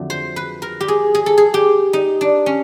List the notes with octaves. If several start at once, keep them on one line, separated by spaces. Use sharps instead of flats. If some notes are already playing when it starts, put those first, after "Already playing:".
Already playing: F2 D3 F#3 A3
C5
B4
A#4
G4
G#4
G#4
A4
G#4
G4
D#4
D4
C#4